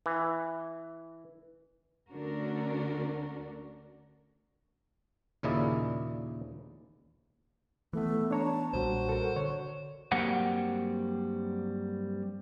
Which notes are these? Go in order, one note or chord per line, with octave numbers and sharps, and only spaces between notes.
E3
D2 D3 C#4 D4 F#4 A#4
D#2 A#2 C#3 E4 D5 D#5
E3 A3 B3
D4 C#5 A5 A#5
B1 A#2 G3 F#4 C5
A4 A#4
D3 C#5
G2 F#3 G3 A#3 C4 F#5